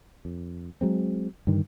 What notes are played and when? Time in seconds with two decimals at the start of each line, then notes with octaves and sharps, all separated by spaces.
0.25 F2
0.81 F#3 G#3 C4
1.47 G2 D3 D#3